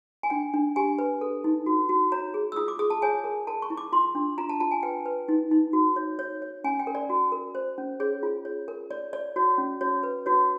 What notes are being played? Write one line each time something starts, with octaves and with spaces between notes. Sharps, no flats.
G#5
D4 G5
D4
G4 G#5
B4
A4
D#4
F#4
F#4
C#5 A#5
G#4
E6
F4 D#6
D6
G#4 D#6
A5
C#5 G#5
A#4
A#4 A5
C#6
E4
D6
F4 C6
D4
F4 A#5
A5
F4 A5
G#5
B4 G5
B4
D#4
D#4
F#4
C#5
C#5
C#5
C#4 G#5
G5
A#4
D5
F#4
A#4
C5
C#4
G#4 C#5
F4
C#5
A#4
C#5 D5
C#5 D5
F#4 C#5
C#4
F#4 C#5
B4
F#4 C#5